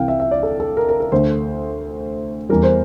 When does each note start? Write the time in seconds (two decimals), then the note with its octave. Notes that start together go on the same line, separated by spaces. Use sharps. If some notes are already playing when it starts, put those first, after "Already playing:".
Already playing: C2 C3 E3 F5 G5
0.08 E5
0.20 E5
0.31 D5
0.43 A4
0.60 A4
0.77 A#4
0.89 A#4
1.00 A#4
1.12 D2 D3 A3 C5
2.49 E2 E3 G3 A#4
2.63 C5